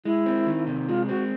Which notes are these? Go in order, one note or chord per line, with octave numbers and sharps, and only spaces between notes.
G#3 E4
C4
D#3
C3
G#3 F4
C4 F#4